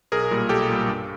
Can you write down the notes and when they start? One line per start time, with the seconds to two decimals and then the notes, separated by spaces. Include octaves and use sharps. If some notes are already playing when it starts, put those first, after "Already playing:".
0.12 B1 G#4 A#4
0.31 A#2 G3
0.49 B1 G4 A4
0.69 A#2 G3
0.88 G2